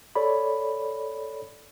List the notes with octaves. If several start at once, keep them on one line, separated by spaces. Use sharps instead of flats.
A4 C#5 D5 B5